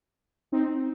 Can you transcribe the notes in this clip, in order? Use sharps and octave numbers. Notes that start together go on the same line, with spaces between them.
C4 D#4